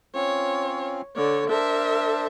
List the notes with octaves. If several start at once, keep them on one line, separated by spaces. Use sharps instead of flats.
C4 C#4 F4 C#5
D3 C#5 D5
D4 A#4 C5 E5 A5